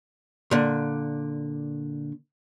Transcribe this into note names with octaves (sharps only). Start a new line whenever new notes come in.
A#2 D3